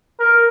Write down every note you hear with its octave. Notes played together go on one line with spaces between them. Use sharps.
A#4